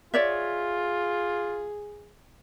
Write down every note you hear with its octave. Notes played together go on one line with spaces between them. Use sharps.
F4 G#4 C#5 D5 E5